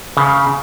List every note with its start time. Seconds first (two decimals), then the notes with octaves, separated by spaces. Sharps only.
0.17 C#3